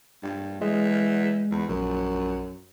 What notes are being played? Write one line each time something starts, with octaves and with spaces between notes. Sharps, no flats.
G2
E3 G#3
E2
A#1 F#2